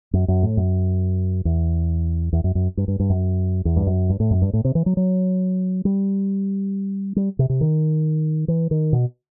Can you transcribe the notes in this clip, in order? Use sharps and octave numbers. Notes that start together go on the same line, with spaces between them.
F#2
F#2
A2
F#2
E2
E2
F#2
F#2
G2
G2
G2
F#2
E2
G2
F#2
G2
A2
F#2
G2
A2
C3
E3
F#3
F#3
G3
G3
C3
C3
D#3
E3
D#3
B2